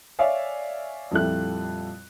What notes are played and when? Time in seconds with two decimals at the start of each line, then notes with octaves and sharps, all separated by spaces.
0.19 C#5 D5 E5 F5 G#5
1.11 F2 A#2 G3 E4 A4 F#6